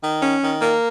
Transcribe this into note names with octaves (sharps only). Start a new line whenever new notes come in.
D#3
C#4
D#3
A#3